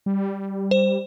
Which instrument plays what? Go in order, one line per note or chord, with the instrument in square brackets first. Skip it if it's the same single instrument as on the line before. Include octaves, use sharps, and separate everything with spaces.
[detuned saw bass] G3
[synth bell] C5